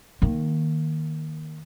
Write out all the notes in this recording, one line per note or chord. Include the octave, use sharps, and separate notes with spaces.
D#3 A#3